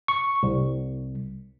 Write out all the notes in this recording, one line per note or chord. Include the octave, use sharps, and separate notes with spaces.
C#6
C2